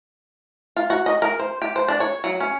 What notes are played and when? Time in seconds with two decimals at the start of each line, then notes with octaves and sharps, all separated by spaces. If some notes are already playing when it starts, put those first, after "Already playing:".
0.76 F4
0.90 F#4
1.06 D#5
1.22 A#4
1.39 C5
1.62 G4
1.76 C5
1.88 D4
2.00 C#5
2.24 F#3
2.40 C#4